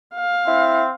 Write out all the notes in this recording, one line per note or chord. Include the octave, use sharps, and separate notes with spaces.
F5
C4 E4